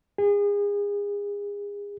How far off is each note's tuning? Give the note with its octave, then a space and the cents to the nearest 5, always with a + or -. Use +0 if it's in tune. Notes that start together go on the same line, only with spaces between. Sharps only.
G#4 -30